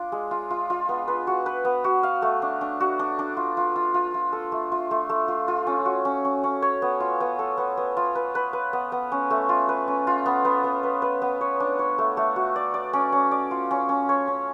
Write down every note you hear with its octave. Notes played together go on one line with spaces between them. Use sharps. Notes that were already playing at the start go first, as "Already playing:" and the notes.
Already playing: D4 F4
G#3
F4
F4
F4
B3
B4
F#4
B4
B3
F#4
F5
A3
D4
D4
F#4
D4
D4
F4
F4
F4
F4
F4
A4
A3
F4
A3
A3
F4
F4
C#4
F#4
C#4
C#4
C#4
C#5
B3
F4
B3
A4
B3
B3
F4
B4
B4
B4
B3
B3
C#4
A3
F4
B4
C#4
F4
B3
B3
B3
B4
B4
B3
C#5
D4
C#5
A3
A3
F#4
D5
D5
C#4
C#4
D5
F4
C#4
C#4
C#5
C#4